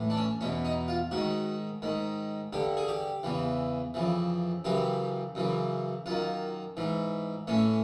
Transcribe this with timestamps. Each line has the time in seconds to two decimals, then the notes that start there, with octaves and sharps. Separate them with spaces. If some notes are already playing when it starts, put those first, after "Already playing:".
Already playing: A2 E3
0.10 D4
0.17 C#4
0.41 E2 B2 C#4
0.65 D#4
0.88 F4
1.11 G#2 D#3 F#4
1.82 G#2 D#3
2.53 G2 D3 G4
2.77 G#4
2.88 G4
3.23 E2 C#3 E3
3.94 F2 C#3 E3
4.64 F#2 C#3 E3 G4
5.35 F#2 C#3 E3
6.06 F#2 D#3 F4
6.77 G#2 E3
7.47 A2 E3 C#4